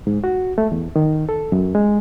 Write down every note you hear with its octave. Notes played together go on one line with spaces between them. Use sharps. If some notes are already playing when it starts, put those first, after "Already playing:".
G#2
F#4
A3
E2
D#3
A4
F#2
G#3